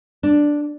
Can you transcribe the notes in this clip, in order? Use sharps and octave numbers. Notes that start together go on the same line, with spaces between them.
D4